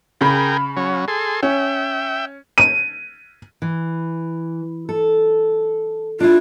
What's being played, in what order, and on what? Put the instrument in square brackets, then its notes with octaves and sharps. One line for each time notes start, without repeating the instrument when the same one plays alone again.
[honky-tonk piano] C#3 B5 [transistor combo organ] G#4 A#4 G5
[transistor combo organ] F#3 C#4
G#4 A4 C6
[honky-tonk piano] C#4 [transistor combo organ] E5 G5
[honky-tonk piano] D#7
[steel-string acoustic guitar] E3
A4
[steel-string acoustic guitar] D4 E4 [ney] F4